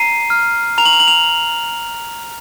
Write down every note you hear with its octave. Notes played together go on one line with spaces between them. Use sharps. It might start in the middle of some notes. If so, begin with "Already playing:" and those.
Already playing: A#5 C7 D#7
F6
A#5 F7
F#7
F7
F#7
F7